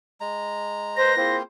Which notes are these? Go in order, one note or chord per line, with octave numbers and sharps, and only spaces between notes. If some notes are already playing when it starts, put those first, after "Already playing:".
G#3 A#5
B4 C5 A#6
A#3 C4 E4 F4 G#4 C5